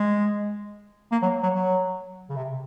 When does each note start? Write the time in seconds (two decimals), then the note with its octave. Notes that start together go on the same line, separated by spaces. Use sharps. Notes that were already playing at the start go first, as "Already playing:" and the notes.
Already playing: G#3
1.12 A#3
1.22 F#3
1.43 F#3
1.53 F#3
2.30 C#3
2.36 C3